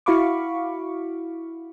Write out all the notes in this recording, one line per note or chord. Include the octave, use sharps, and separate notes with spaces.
E4 F#4 F5 B5 C#6 D6